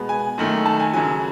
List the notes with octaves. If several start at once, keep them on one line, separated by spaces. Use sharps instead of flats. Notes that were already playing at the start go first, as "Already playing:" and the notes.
Already playing: B2 G#3 B3
G#5
F#2 D#3 A3
A5
G#5
F#2 C#3 F#3 G#5